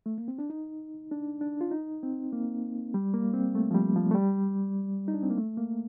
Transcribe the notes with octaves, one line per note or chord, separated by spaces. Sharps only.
A3
A#3
C4
D4
D#4
D4
D4
F4
D#4
C4
A#3
G3
A#3
C4
A3
F3
G3
F3
A3
G3
D#4
D4
C4
A#3
A3
A#3